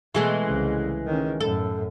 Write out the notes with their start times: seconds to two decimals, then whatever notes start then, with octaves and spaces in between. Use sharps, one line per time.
0.15 B2 E3 G#3 A3
0.46 C2 C#3
1.06 D#3 C#4
1.40 F#2 A2 A4